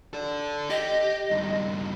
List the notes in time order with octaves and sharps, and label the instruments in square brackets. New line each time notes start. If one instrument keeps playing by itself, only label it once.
[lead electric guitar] A4 D5
[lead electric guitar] G4 [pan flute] D#5
[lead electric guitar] G2 D#3